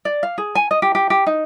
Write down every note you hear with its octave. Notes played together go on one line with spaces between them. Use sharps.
D5
F5
G#4
G#5
D#5
G4
G4
G4
D#4